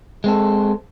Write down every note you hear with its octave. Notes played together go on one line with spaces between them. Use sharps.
G#3 C4 A4